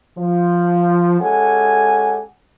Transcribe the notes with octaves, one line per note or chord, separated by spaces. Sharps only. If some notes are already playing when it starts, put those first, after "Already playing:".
F3
G#3 C#4 G4 A4 F#5 G#5